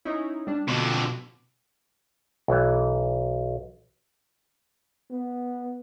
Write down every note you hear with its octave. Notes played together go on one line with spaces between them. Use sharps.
C#4 D#4 E4
G3 D4
F2 B2 D3
B1 E3
B3